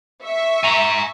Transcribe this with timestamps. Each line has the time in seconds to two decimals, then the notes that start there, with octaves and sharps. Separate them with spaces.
0.24 E5 C#6
0.64 G#5 A#5